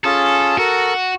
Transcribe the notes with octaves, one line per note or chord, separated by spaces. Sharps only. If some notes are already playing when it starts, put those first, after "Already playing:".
C#4 F4 G#4 A4
F#4 A4 A#4